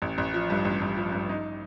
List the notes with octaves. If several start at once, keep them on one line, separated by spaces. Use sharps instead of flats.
A1
A1
F3
G2
A1
A1
F3
G2
D#4